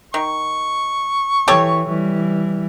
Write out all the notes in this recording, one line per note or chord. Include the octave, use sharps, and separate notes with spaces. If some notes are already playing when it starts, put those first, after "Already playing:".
D#3 C#6
E3 G4 A4 C#5
E3 G3